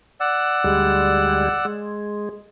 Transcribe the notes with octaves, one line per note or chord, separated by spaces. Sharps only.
D5 F#5 E6
D2 G3 G#3
G#3